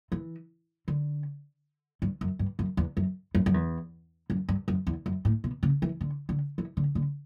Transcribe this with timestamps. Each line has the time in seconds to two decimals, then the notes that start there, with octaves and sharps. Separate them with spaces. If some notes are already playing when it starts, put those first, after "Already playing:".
0.12 E3
0.88 D3
2.02 G2
2.21 F#2
2.39 G2
2.59 F#2
2.77 E2
2.97 F#2
3.35 F#2
3.46 F#2
3.54 E2
4.30 F#2
4.49 G2
4.68 F#2
4.87 E2
5.06 F#2
5.25 A2
5.44 B2
5.63 C#3
5.82 E3
6.01 D3
6.29 D3
6.58 E3
6.77 D3
6.95 D3